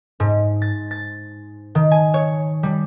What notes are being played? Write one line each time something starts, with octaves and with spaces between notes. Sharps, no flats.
G#2
A6
A6
D#3
G#5
C#5
G3